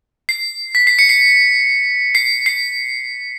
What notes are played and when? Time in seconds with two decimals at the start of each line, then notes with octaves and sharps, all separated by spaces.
0.29 C7
0.75 B6
0.87 C7
0.99 C#7
1.09 C7
2.15 C7
2.46 C7